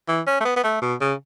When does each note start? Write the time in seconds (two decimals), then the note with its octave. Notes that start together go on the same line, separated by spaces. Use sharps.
0.08 E3
0.27 C#4
0.40 A3
0.45 B3
0.56 B3
0.64 A3
0.81 B2
1.01 C#3